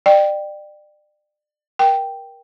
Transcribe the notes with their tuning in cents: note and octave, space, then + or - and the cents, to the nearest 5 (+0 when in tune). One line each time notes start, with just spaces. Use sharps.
D5 +35 G5 +0
A#4 +25 G5 +0